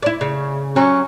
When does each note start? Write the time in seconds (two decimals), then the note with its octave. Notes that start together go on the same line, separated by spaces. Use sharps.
0.02 E4 D5
0.21 C#3
0.76 F#3 C#4